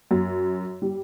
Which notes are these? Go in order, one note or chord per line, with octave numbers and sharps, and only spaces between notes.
F#2
G3